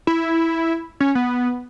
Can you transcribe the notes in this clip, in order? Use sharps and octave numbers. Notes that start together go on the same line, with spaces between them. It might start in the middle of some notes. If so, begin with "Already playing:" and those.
E4
C#4
B3